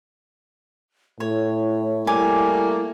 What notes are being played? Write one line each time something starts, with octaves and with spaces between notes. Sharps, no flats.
A2 E4 C#5
G3 A3 A#3 G#5 D6